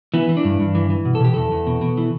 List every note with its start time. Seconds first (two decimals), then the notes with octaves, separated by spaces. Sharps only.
0.14 E3 B3
0.29 E3
0.37 D4
0.45 G2
0.60 G2
0.75 E3
0.90 E3
1.05 B2
1.15 A4
1.20 B2 G4
1.34 E2 A4
1.51 E2
1.67 B2
1.81 B2
1.97 E3